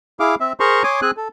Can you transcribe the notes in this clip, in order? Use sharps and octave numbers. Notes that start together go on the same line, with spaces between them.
E4 G#4 F5 D6
C4 E5
G#4 A#4 C5 A#5 C6 C#6
C#5 G#5 C6 D6 D#6
C4 G#4 G#5 F#6
A4